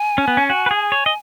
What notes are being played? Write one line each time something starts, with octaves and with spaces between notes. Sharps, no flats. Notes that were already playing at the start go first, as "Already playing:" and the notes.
Already playing: G#5
C#4
B3
C#4
F#4
B4
G#4
C#5
D#5